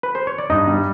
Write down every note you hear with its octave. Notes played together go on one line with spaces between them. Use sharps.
B4
C5
C#5
D5
G2 D#4 D#5
G3